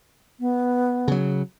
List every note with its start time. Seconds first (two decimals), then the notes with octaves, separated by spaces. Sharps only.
0.40 B3
1.08 C#3 F#3